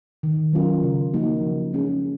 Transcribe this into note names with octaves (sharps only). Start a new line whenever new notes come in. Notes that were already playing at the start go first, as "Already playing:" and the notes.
D#3
F#3 C#4 F4 A#4
C#3
F3 A#3 D#4 F#4
C#3
G#3 C#4 G#4